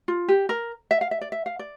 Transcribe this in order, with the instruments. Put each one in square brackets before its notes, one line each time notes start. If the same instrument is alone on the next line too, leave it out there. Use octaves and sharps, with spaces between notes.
[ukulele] F4
G4
A#4
E5
F5
E5
D5
E5
F5
D5